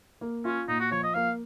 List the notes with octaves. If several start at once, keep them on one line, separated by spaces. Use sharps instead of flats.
A#3
C#4 F4
A#2 D#4
F#4
F3 C#5
D#5
A#3 F5